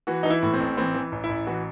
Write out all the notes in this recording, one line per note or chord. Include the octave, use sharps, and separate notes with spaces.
E3 F#4
E3 D#4
E4
A2
C4
A1
E3 C4
E3
A1
E4
A1
E3 F#4